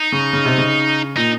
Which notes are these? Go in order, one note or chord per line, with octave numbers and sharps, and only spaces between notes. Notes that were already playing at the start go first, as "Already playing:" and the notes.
Already playing: D#4
C#3
C#3
C3
C#3
A#2 D#4